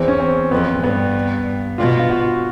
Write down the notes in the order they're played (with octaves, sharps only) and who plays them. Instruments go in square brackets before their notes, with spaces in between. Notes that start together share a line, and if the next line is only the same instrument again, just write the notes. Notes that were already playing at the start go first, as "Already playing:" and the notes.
Already playing: [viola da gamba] E2 [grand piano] C4
[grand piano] C#4
C4
[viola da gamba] F2 [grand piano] B3
[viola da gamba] G2 [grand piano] B3
[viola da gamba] B2 [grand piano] F4
[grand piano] F4
F#4